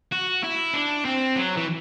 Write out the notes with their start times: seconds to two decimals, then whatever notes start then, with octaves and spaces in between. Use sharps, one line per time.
0.12 F#4
0.44 E4
0.74 D4
1.05 C4
1.36 F#3
1.56 E3